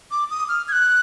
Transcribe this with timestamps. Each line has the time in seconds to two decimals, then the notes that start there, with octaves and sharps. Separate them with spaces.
0.11 D6
0.31 D#6
0.49 F6
0.68 G#6
0.72 F#6